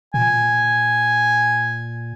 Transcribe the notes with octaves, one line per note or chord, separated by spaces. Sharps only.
A#2 G#5